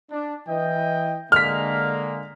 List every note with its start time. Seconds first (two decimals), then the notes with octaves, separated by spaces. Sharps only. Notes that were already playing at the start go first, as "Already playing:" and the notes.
0.11 D4
0.48 E3 D#5 G5
1.32 D3 G#3 A#3 F6 B6